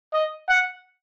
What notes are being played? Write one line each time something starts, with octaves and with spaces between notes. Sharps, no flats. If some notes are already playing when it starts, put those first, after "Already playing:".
D#5
F#5